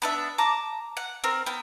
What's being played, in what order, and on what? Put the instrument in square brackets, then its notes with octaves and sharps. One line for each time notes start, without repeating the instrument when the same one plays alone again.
[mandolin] B3 D4 E5
A5 A#5 D6
F#5
C4 A#4
B3 G5